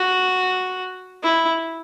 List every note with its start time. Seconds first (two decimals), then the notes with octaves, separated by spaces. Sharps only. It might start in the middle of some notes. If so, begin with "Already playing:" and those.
Already playing: F#4
1.23 E4